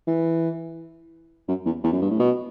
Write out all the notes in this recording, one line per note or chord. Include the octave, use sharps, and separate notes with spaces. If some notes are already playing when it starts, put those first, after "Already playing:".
E3
F#2
E2
E2
F#2
G2
A2
B2